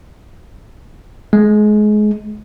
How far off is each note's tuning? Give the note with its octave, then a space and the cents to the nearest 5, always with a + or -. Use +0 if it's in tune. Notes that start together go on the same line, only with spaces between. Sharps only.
G#3 +25